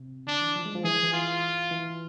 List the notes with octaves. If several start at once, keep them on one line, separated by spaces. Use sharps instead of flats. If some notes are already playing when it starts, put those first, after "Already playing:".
Already playing: C3
D3 D4
E3
F3
G#3
F3
E3 G#4
E3
F4
E3